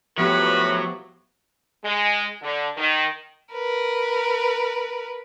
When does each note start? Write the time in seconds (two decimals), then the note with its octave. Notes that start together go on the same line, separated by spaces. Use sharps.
0.18 A2 F3 F#3 B3 F#4 G4 B4
1.84 G#3
2.42 D3
2.77 D#3
3.52 A#4 B4